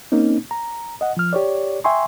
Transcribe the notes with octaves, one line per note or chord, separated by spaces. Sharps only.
A#3 C4 C#4 D#4
A#5
D#5 F#5
F3 F6
G4 C#5 D5
E5 G5 G#5 C6 C#6